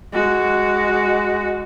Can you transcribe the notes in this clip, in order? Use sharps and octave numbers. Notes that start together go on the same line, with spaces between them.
G#3 F#4